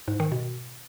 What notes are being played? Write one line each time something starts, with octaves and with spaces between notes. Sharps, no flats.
G#2
D#3
B2